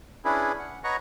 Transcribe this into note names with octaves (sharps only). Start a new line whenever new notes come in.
C#4 D4 E4 G#4 B4
F#5
B4 C#5 D#5 F#5 A#5 C#6